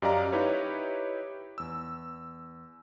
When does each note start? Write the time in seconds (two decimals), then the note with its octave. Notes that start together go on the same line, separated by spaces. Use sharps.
0.02 F#2 G4 D5 D#5 F5 A#5
0.32 D#4 E4 G4 B4 C#5
1.58 E2 E6